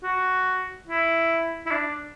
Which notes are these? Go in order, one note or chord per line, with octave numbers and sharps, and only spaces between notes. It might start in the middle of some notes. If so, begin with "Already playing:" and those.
F#4
E4
E4
D4